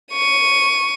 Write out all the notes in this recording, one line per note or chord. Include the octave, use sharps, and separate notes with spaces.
C#6 D#7